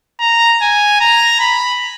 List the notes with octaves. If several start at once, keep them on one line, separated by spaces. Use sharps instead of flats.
A#5
G#5
A#5
B5